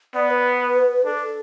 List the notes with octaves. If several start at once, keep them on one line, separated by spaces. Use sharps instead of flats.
B3 D5
B4
D4 A4